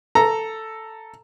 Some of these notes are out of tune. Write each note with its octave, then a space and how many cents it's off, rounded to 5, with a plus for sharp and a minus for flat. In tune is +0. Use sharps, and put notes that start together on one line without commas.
A4 +5 A#5 +0